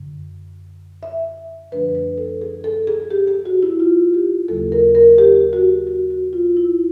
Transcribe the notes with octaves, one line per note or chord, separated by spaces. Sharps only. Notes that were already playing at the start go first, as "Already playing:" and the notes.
Already playing: F#2 D3
E5
F#2 D3 F3 A3 D4 B4
B4
A4
G#4
A4
G#4
G4
G#4
F#4
E4
F4
G4
D#2 C#3 F#3 A#3 A4
A#4
A#4
G4
F#4
F#4
F#4
F4
E4